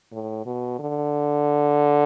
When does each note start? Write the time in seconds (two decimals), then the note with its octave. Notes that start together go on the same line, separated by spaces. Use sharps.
0.13 A2
0.46 B2
0.79 D3